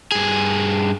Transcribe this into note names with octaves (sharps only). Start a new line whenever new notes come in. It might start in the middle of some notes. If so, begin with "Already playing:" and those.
G2 G#4